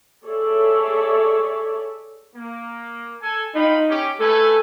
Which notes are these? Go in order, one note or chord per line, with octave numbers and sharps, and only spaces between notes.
G#4 A4 C#5 D5 E5
A#3
A4 G#5
D#4 F4 G5 B5
C#4 G4
A3 A4 B4 G#5